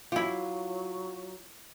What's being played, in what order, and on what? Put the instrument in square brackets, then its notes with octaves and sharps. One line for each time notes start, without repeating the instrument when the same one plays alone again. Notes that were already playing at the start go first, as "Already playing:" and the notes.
[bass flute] F#3 [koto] E4 G4 [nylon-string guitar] F4